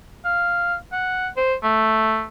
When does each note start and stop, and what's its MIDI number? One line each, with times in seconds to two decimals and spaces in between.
0.25 0.75 77
0.92 1.28 78
1.37 1.54 72
1.63 2.25 57